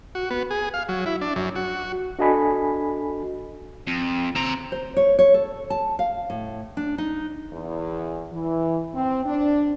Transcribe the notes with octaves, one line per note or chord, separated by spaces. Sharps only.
F#4
B3
G#4
F5
F#3
E4
D4
F#2
F#4
D4 F#4 A4 D#5 G#5 B5
F2
C4 A#5
C5
C#5
C#5
A4
A5
F5
A2
D4
D#4
E2
E3
C4
D4